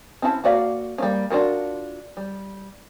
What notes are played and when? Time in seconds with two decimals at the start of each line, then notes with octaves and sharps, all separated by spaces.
0.22 C4 C#4 E4 D#5 A5
0.44 A#3 F#4 D5 F5
0.98 G3 A#3 C#4
1.30 D4 F4 F#4 A#4
2.17 G3